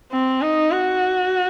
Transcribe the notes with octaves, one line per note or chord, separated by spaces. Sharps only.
C4
D#4
F#4